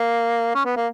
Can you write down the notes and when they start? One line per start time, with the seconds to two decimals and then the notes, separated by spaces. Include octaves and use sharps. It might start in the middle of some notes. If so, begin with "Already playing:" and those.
Already playing: A#3
0.55 C#4
0.65 B3
0.77 A#3